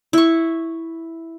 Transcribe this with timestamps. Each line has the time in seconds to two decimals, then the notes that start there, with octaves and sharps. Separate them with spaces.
0.13 E4 C#6